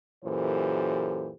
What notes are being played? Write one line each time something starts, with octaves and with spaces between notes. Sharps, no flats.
F#2 A#2 E3 G4 A4 C5